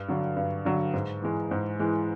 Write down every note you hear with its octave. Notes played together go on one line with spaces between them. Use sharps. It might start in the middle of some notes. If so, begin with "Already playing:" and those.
Already playing: G2
D3 F#3
G2
D3 F#3
G#2
E3 G#3
G#2
E3 G#3